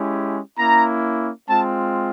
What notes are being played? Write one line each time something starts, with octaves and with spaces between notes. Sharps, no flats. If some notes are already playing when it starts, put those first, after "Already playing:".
Already playing: G#3 C#4 E4 G4
A#3 C#4 E4 A#5
G#3 C4 F4 A5